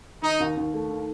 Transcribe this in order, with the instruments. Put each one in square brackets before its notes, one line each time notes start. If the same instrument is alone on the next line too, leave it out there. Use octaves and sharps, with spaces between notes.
[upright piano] D#3 [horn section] D#4
[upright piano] D#2
D#2
A3
D#3